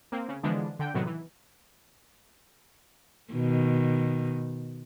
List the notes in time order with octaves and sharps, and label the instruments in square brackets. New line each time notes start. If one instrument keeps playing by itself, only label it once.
[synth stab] A#3 C4
C#3
D3 E3 F3 G#3 B3 D4
D3 G5 G6
A2 C3 D#3 F#3 B3
E3
[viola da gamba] B2 D#3